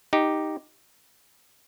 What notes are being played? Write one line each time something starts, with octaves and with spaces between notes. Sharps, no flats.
D#4 G4